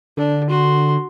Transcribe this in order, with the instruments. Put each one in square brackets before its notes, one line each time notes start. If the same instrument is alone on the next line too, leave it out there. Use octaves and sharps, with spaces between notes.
[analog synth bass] D3 [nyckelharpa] D4
[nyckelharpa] F#4 C6